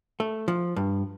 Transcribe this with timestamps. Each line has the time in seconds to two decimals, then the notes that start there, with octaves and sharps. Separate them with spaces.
0.20 A3
0.48 F3
0.76 G2